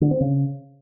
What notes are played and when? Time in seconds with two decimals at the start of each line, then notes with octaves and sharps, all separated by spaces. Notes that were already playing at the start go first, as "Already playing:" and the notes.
0.01 D3
0.11 C4
0.21 C#3